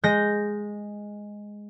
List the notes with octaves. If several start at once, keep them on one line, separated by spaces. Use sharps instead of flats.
G#3 G6 A#6